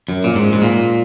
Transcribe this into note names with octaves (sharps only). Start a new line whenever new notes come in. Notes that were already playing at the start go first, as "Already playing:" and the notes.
F#2
A#2
G#2
G#2
A#2